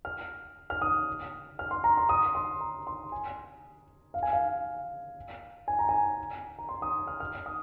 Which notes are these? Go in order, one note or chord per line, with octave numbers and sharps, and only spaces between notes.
F6
F6
D#6
F6
C6
A#5
C6
D#6
C6
A#5
C6
G#5
F5
G#5
F5
G#5
A#5
G#5
A#5
C6
D#6
F6
F6
D#6